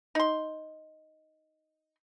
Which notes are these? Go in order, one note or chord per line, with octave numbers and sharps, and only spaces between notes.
D#4 C6